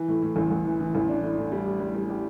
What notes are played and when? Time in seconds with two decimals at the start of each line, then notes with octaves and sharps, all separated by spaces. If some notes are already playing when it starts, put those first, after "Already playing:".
Already playing: E3
0.08 A2
0.22 A2
0.36 A1
0.50 A1
0.66 E3
0.80 E3
0.95 A1
1.08 D4
1.22 A2
1.37 A2
1.52 G3
1.66 G4
1.80 G3
1.95 G3
2.10 G4